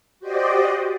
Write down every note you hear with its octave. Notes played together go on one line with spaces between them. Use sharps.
F#4 G4 C5 D5 D#5